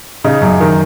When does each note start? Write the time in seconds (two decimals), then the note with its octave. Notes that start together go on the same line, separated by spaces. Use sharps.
0.24 C#3 D#4
0.41 F#2
0.60 D#3